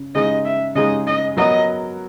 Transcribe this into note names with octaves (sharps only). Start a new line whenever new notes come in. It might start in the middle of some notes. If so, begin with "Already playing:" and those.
Already playing: C#3
C#3 G#3 D#4 G#4 D#5
E5
C#3 G#3 D#4 G#4 D#5
D#5
F#3 B3 F#4 A#4 D#5